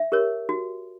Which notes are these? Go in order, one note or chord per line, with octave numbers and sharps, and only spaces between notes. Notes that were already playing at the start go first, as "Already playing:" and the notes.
Already playing: E5
G4 A#4 C#5
F#4